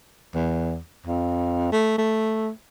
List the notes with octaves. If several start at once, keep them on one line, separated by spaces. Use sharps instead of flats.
E2
F2
A3
A3